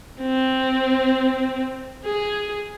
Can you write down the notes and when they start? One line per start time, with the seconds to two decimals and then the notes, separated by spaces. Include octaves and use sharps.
0.22 C4
2.05 G#4